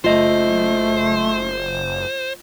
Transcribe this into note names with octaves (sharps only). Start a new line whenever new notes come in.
F#1 A3 F4 C5 D#5